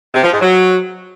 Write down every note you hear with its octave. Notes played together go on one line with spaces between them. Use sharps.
C3
F3
G#2
F#3